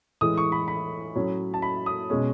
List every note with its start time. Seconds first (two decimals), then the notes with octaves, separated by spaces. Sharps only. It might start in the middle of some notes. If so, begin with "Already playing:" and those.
0.21 A2 E3 G#3 D#6
0.37 C#6
0.52 B5
0.68 B5
1.16 A2 F#3 C#4
1.54 A5
1.62 B5
1.86 D#6
2.10 B2 G#3 C#4